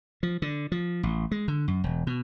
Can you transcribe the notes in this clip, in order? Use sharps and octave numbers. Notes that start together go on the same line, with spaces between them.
F3
D3
F3
A1
G#3
D3
F#2
E1
B2